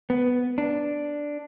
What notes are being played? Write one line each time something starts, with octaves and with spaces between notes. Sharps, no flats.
B3
D4